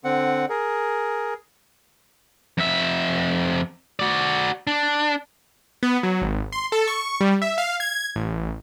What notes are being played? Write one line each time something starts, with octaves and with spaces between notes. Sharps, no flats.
D3 C4 F#5
G#4 A#4
F2 E5
F#4 D5
D4
B3
F#3
G#1
C6
A4
C#6
G3
E5
F5
G#6
A1